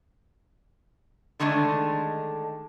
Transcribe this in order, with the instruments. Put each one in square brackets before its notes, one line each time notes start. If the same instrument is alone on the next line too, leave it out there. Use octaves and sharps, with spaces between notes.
[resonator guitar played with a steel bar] D3 D#3 G#3 A3 D4